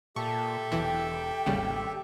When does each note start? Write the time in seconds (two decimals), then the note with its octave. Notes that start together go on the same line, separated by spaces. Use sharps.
0.16 A#2 G4 A4 E5 A5 C#6
0.72 E1 B1 E3 G5
1.46 G#1 D#2 C#3 G3